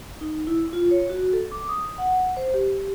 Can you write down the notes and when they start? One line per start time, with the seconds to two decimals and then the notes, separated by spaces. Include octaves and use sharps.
0.21 D#4
0.47 E4
0.73 F4
0.91 C#5
1.09 F#4
1.33 A4
1.52 D6
1.68 D#6
1.98 F#5
2.37 C5
2.54 G4